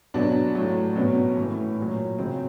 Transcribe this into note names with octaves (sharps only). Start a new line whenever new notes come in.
B2 F#3 D4
A2 F#3
B2 F#3 C#4
A2 E3
A#2 F#3
C#3 F#3 C4